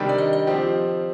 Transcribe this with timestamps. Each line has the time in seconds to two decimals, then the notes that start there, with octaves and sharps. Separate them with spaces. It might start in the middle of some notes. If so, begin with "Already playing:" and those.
Already playing: C3 D#3 G3 D4 G4
0.09 D5
0.18 D#5
0.33 D#5
0.47 F3 C4 G4